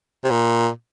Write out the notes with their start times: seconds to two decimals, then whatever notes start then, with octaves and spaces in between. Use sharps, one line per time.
0.24 C3
0.30 A#2